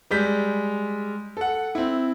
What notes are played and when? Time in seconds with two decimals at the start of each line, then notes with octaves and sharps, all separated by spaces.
0.11 G3 G#3 G6 B6
1.37 A4 F#5
1.75 C4 E4